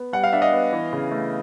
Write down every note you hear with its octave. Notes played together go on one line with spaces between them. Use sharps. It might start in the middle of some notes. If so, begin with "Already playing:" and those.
Already playing: B3
G3 F#5
F5
D4 E5
D#5 F5
B3
E3
C#3
A3